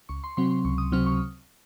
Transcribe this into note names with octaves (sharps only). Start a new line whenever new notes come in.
C#2 C#6
C6
C3 F#3 C4 C6
C6
C#2 C#6
D#6
C3 F#3 C4 F6
C#6